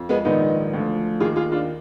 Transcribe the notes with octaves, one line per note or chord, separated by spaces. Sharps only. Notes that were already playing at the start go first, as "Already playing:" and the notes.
Already playing: F2
G#3 B3
A#1 G#2 D#3 B3 D#4
D2 D3 F3
D#2 D#3 F4 G#4
F4 G#4
D4 F4